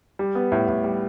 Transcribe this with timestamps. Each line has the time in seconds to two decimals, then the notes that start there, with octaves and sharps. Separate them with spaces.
0.19 G3
0.35 B3
0.52 A2
0.68 A2
0.84 G3